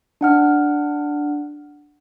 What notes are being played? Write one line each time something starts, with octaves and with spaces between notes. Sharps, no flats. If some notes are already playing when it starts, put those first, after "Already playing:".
D4 F#5 F6